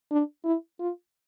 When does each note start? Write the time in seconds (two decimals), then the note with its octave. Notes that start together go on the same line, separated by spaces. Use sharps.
0.11 D4
0.45 E4
0.80 F4